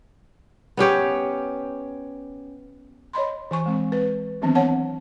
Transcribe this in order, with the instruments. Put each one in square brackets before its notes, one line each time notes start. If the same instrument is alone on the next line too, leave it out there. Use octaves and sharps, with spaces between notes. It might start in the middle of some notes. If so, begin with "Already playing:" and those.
[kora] B3 C#4 G4 C#5
[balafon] C#5 D#5 B5 C6
E3 G#5 C#6
G#3 C4
B4
D#3 E3 F#3 B3 C4 D4
C#5 F#5 A5